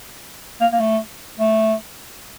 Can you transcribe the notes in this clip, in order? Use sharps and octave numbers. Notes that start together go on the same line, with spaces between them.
A#3
A#3
A3
A3